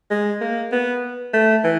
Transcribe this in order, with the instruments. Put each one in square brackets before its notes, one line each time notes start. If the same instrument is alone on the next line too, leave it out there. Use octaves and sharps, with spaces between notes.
[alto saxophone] G#3
A#3
B3
A3
E3